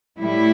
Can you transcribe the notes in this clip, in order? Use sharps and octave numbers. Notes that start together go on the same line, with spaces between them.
A2 G3 E4